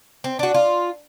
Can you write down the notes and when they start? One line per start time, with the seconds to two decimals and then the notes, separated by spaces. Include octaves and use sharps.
0.24 C4
0.39 D4 F#4
0.54 F4